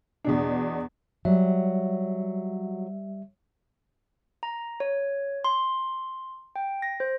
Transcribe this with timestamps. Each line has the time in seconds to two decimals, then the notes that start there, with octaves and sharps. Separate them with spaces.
0.24 E2 B2 D4
1.25 F#3 G3 E5
4.43 A#5
4.80 C#5
5.45 C6
6.56 G5
6.82 A#6
7.00 C5